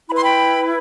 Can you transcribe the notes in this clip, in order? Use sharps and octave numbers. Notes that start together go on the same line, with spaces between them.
E4 B4 B5 C6
G5 B5